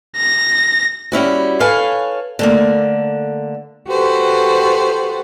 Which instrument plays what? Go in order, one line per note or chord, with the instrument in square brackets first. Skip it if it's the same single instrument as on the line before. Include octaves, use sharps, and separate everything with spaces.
[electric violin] A#6
[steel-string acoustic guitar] G3 C#4 E4 F#4
A4 B4 C#5 F5 G#5
D3 A3 A#3
[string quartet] F#4 G4 A4 B4 C5